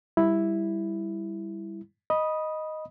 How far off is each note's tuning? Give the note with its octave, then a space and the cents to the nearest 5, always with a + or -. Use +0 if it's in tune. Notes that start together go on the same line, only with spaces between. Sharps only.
G3 +10 E4 +0
D#5 +0 B5 -15 D#6 +0